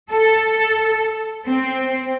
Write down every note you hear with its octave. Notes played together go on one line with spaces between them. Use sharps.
A4
C4